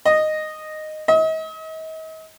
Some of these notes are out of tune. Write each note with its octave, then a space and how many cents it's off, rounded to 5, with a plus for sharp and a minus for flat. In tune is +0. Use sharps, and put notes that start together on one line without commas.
D#5 -10
D#5 +40